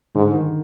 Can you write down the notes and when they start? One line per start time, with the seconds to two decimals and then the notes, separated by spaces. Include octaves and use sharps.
0.15 G#2 D3
0.34 D#3